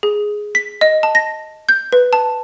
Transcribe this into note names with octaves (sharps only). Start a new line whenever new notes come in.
G#4
B6
D#5
A5
A#6
G6
B4
A5